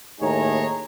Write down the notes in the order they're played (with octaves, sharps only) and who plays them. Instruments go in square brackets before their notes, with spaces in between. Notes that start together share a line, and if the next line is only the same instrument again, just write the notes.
[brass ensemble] D#2 A2 D#4 G#4 C#5 A#5